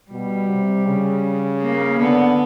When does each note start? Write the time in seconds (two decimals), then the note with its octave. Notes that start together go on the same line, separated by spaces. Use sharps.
0.11 B2 G3
0.49 C3
0.87 C#3
1.62 A#3
2.00 D3 B3